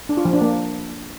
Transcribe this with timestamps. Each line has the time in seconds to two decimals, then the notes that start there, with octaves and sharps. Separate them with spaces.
0.09 D4
0.17 F4
0.25 F3
0.33 D4
0.41 A#3